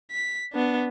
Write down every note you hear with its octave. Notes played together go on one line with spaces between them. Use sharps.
B6
B3 D4